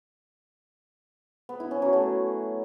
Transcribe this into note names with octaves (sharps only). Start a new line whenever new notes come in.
B3
E4
C#4
F#3
A3